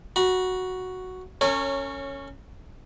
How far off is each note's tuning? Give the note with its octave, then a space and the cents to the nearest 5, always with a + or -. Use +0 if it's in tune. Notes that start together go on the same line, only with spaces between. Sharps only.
F#4 +0 B5 -40
C#4 +0 A#4 -45 C#5 -10